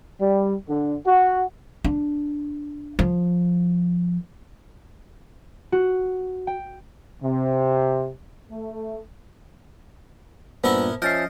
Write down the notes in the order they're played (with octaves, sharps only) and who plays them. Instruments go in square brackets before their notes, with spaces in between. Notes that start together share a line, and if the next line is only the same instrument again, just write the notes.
[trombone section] G3
D3
F#4
[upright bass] D4
F3
[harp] F#4
G5
[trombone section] C3
A3
[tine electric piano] G2 A#2 [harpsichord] B3 E4 A#4 [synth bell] C5
[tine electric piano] F3 C#4 E5 [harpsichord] D#5 [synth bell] F6 [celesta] G6 A6 C7